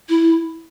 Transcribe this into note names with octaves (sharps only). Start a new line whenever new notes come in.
E4